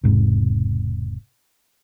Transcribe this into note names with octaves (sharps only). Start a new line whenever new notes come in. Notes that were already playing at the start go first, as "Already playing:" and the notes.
E1 G#2 C3